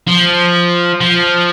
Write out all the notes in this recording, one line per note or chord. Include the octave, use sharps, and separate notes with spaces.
F3
F3